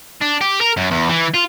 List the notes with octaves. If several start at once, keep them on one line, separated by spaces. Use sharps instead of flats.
D4
G4
A#4
F#2
E2
E3
F4